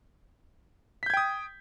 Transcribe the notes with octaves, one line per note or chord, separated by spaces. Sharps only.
G5 D#6 G6 G#6 B6